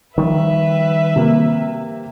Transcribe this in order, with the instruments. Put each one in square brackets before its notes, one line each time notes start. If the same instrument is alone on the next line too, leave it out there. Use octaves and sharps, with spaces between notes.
[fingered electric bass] D#3 F3 G3 [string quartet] B4 E5
[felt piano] C3 A#3